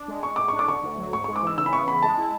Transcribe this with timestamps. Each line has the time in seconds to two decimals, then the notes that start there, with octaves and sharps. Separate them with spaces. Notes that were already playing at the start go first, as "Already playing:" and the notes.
Already playing: D4
0.08 G#3
0.23 G#3 C#6
0.36 A2 D6
0.48 D4 C#6
0.59 D6
0.68 D3 C#6
0.83 D2
0.98 F#3
1.13 G#2 C#6
1.24 G#3 C#6
1.36 D6
1.43 E3 E6
1.58 C#3 E6
1.66 B5
1.73 B3 C#6
1.87 E3 B5
2.02 G#3 A5
2.18 E4